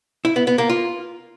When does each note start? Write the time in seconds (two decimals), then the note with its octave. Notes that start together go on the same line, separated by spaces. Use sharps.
0.25 E4
0.36 B3
0.47 B3
0.58 A#3
0.69 F4